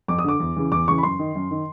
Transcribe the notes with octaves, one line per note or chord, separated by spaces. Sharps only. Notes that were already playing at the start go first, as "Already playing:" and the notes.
F2 D6
D#6
D3 D6
E2
C#3 E3
E2 D6
C#3 E3 C#6
B5
F#2 C6
D#3
F#2
D#3